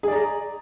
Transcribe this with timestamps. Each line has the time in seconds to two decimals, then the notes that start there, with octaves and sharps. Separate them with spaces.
0.03 G#4
0.08 D5
0.13 A#5